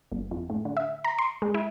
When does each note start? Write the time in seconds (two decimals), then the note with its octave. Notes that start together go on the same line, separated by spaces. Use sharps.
0.12 G1
0.31 F2
0.50 A2
0.65 D3
0.77 E5
1.05 A#5
1.19 C6
1.42 G#3
1.54 E4